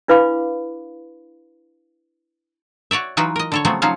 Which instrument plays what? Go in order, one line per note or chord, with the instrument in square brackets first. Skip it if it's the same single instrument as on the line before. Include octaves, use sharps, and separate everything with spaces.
[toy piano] D4 E4 B4 F5 B5 D6
[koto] F#4 C#5 D5 E5
E3 F#3 D#4 F4 F#4 B4
A#4 D#5
D3 A4 C#5
C#3 F3 F#3 A3 B3 C4
F3 F#3 C#4 D#4 F4 F5